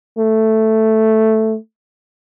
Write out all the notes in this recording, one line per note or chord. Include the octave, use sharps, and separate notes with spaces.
A3